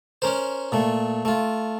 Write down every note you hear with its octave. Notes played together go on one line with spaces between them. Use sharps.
C#4 A#4 C5
A#2 A3
A3 F4